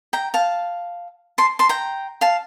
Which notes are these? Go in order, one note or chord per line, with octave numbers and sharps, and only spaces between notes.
G5 A#5
F5 A5
A5 C6
A5 C6
G5 A#5
F5 A5